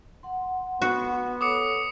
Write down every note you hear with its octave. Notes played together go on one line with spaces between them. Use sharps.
F#5 C6
B3 F#4
A4 C#5 D6 D#6 C#7